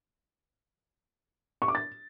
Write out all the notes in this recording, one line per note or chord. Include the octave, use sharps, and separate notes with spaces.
C#6
D6
A6